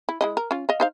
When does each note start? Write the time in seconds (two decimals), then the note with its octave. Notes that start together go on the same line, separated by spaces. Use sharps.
0.09 E4
0.21 G#3 E4 D#5
0.37 A#4
0.51 C#4 F4
0.69 D#5 F5
0.80 D#4 C5 F5